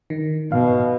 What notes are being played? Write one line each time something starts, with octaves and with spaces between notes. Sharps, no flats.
D#3
B2 F5